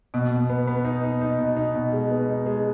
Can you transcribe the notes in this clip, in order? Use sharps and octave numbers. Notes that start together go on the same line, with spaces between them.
B2
B2
B3
B3
D#4
D#4
D#4
B2
D#4
B2
G#3
B3
D#4
G#3